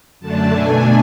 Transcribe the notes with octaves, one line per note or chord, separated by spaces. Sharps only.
F#2 D3 A3 D4 A5
B2 A3 D4 G#5